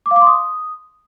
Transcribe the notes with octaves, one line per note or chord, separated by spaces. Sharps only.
D6
F5
D6
C6
D#6